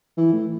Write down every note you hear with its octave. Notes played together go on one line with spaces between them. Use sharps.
E3
A2